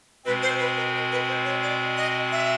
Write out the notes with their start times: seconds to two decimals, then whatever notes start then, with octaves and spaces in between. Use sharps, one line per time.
0.25 B2 G#3 C4 B4
0.43 C5
0.59 B4
0.77 A#4
0.94 A#4
1.12 B4
1.28 C5
1.45 C#5
1.62 D5
1.97 D#5
2.32 E5